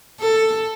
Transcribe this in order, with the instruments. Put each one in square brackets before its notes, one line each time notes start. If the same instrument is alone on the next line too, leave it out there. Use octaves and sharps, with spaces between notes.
[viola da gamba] A4